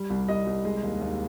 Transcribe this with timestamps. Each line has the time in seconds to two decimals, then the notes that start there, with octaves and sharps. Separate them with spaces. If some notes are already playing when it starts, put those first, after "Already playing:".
Already playing: G3
0.10 C2
0.28 C2 D#5
0.46 C2
0.65 G#3
0.83 D#2
1.01 D#2